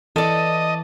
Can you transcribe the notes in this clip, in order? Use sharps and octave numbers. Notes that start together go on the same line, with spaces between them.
E3 A4 D5 D#5